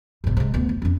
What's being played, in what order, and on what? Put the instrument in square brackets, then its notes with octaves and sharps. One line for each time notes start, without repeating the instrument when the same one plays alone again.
[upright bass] G1 C3
C3 G#3
D2 B3
F1
F2 C#4